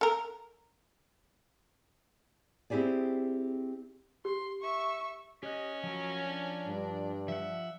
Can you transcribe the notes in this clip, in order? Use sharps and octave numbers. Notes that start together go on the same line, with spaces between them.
A4 A#4
C4 E4 G4 G#4 D5
G4 C6
E5 C#6
C#4 G4 D#5 F#6
F3 F#3 A#4
D4
G2
F3 E5 F#5